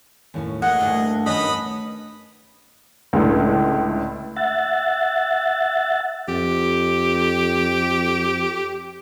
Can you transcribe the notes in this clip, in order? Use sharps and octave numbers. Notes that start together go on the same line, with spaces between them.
D#2 A2 C#4
A3 A#3 G#4 D#5 F#5
D2 G2
D#3 B3 C#4 D#5 B5 D#6
C#2 A2 D3
E5 F#5 A6
F2 G4